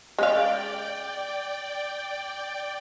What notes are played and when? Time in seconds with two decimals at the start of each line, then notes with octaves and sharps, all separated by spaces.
0.19 G#3 C#4 D5 F5 G5